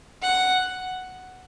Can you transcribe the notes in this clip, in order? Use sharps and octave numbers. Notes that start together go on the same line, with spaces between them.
F#5